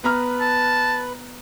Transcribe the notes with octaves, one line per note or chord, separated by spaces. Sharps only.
B3 B4 A#5 F6
A5